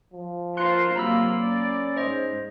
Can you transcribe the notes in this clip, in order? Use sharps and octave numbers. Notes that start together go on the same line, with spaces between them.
F3
F4 A#4 C5 C6 F#6 C#7
C3 F#3 A#3 F4 A#5 B5 E6
A#3 C#4 D5
G#2 C5 D#5